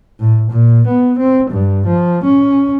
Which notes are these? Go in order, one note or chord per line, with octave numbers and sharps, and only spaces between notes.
A2
A#2
B3
C4
G2
F3
C#4